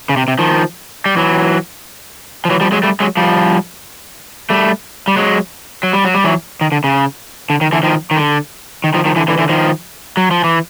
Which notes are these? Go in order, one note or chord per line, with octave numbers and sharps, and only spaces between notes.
C#3
C3
C3
D#3 F3
G3
E3 F#3
F3
E3 F#3
F3 G3
F#3 G#3
G3 A3
F#3 G#3
F3 G3
G3 A3
G3
F#3 G#3
F#3
G3
F#3
G3
E3 F#3
D#3
D3
C#3
D3
D#3
D3 E3
D#3 F3
D#3
D3
D#3
D#3 F3
D#3 F3
D3 E3
D3 E3
D3 E3
D#3 F3
F#3
F3
E3